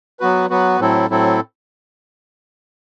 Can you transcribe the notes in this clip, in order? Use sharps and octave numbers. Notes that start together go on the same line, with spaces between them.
F#3 B3 F#4 B4
F#3 B3 F#4 B4
A2 F#3 C4 E4 A4
A2 F#3 C4 E4 A4